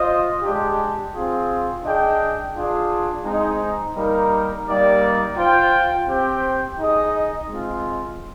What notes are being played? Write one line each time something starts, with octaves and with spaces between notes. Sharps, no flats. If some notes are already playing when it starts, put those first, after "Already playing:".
Already playing: F4 C5 D#5
G#3 D4 G4
C4 F4 G#4
D4 G#4 D#5 G5
D4 F4 G#4
G#3 C4 D#4
G3 A#3 D#4 A#4
G3 A#3 D#4 G4 D5
F4 C5 G5
C4 G4 C5 G5
D#4 G#4 D#5
G#3 C4 F4